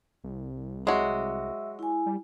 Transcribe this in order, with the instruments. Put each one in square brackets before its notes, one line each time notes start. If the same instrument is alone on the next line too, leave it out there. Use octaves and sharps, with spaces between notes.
[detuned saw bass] C2
[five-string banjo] F#3 F#4 [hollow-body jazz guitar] G#3 [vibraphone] E5 E6
[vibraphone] E4 G#5
[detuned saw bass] G3